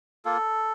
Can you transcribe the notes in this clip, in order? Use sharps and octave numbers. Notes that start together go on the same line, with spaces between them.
A#3 F4 A4